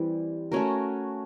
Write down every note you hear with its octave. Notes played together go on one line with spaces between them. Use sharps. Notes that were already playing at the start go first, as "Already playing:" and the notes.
Already playing: E3 G3 C4
A3 C#4 F#4 A#4